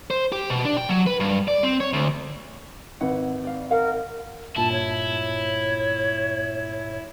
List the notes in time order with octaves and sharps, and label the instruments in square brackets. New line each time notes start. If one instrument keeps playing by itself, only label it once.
[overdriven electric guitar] C5
G4
B2
D4
G5
F#3
B4
G2
D5
C4
C#5
D2
[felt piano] G#1 B4 [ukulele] E4 F#5
[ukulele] D5 F5
[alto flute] A#4 [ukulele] F5 F#5
[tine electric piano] G2 A#2 [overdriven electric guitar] E4 [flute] A5
[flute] C#5